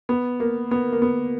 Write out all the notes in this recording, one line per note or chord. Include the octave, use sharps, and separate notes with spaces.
B3
A#3
B3
A#3
B3